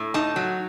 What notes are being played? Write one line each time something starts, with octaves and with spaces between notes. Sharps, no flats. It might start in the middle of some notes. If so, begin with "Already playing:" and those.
Already playing: A2
D#4 A5
F#3